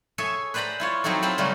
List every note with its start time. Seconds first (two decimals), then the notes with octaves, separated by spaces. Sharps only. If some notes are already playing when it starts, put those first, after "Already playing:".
0.18 G#4 A4 C#5 E5 G#5
0.54 B4 C5 D5 G5 A#5 B5
0.80 E4 F4 C#5
1.04 F#3 C4 D#4 E4 A4
1.22 C4 F4 C5 B5
1.38 C#3 F#3 G3 A3 C#4